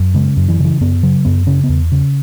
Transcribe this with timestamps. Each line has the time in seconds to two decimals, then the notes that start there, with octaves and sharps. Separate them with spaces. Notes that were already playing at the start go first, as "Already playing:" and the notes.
Already playing: F#2
0.14 C#3 G#3
0.37 F#2
0.49 E3
0.59 C#3
0.64 E3
0.81 F#2 B3
1.03 C#3 F#3
1.25 F#2 B3
1.47 C#3 C#4
1.64 B3
1.69 E2
1.92 C#3